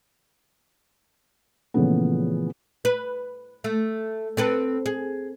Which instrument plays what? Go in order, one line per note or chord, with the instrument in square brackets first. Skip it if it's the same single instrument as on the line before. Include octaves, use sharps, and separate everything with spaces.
[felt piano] A#2 C#3 E3 F3 A3 B3
[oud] B4
A3
C4 A4 B4
G#4